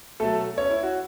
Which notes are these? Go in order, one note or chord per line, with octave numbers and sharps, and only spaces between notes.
B2 F#3 A3 A4
C#4 C#5
E4
F#4